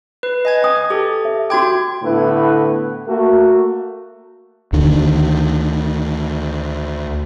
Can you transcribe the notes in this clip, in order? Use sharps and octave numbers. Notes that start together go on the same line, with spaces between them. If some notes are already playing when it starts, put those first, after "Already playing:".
B4
D#5 G#5 G#6
G5 D#6
G4 A4
E5
F#4 G5 C6 D6 G#6
A2 D3 B3 E4 B4
A3 A#3 F#4
D2 D3 D#3